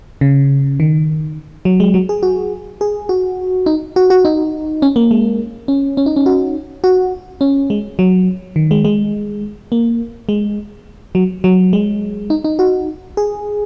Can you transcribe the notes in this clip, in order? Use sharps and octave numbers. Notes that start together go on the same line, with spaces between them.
C#3
D#3
F#3
G#3
F#3
G#4
F#4
G#4
F#4
D#4
F#4
F#4
D#4
C#4
A#3
G#3
C#4
C#4
D#4
C#4
F#4
F#4
C#4
G#3
F#3
D#3
G#3
G#3
A#3
G#3
F#3
F#3
G#3
D#4
D#4
F#4
G#4